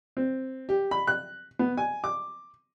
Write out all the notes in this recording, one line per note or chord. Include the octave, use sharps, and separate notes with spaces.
C4
G4
B5
F#6
B3
G#5
D6